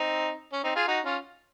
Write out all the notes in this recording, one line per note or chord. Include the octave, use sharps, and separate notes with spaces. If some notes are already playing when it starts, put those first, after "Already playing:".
Already playing: C4 D#4
C#4
C4 D#4
F4 G#4
D#4 F#4
C#4 F4